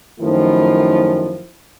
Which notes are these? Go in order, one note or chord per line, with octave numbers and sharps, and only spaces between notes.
F#2 D#3 F3 A3 E4